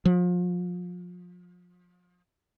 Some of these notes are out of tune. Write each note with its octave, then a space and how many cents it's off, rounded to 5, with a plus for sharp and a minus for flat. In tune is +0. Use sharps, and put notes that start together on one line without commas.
F3 +30